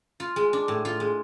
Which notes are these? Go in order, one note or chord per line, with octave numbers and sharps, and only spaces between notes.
F4
G#3
D4
A2
F4
G#3